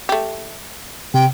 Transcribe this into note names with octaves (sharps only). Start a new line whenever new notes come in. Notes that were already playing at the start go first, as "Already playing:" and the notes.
A3 G4
C3 G5